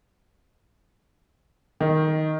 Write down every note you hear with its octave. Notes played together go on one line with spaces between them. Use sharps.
D#3